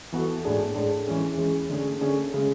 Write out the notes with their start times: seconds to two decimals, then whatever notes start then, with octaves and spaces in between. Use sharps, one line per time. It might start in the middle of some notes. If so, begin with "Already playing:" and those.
0.12 E3 B3 F#4 A4
0.44 A2 G#3 D4 G#4
0.75 A2 G#3 D4 G#4
1.07 E3 G#3 C#4 G#4
1.38 E3 G#3 C#4 G#4
1.70 D3 A3 C#4 G#4
2.01 D3 A3 C#4 G#4
2.34 C#3 G#3